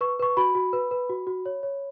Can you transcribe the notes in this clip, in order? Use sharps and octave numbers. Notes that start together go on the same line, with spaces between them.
B4 C#6
B4 C#6
F#4 B5
F#4
B4
B4
F#4
F#4
C#5
C#5